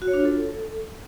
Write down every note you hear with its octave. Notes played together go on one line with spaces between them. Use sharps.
F#4
C#5
D4
F4
A4